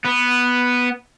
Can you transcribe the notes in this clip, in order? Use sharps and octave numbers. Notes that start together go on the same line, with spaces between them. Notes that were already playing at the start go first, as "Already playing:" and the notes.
B3